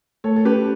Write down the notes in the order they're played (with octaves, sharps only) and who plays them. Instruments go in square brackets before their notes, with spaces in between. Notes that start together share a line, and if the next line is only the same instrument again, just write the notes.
[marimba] A3 [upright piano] A4 C#5
[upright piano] A4
[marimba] C#4 [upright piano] G4 B4